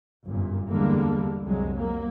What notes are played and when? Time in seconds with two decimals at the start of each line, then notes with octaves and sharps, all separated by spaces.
0.25 G1 F#2 A#2
0.69 E2 D3 G3 G#3 A#3
1.45 C2 F2 F#3 G#3
1.73 F#3 A#3